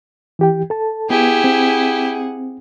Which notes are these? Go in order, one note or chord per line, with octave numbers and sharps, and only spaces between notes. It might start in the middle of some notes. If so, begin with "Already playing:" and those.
E3 G4 G5
A4 A5
B3 E4 G4 G#4 F#5
C4